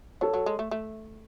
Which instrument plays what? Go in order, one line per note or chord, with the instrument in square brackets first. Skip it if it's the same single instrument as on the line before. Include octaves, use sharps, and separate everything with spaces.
[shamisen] F#3 [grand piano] A4 C#5
[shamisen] F#3
G#3
A3
A3